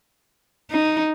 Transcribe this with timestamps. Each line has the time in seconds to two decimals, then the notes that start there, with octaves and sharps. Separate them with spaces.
0.70 D#4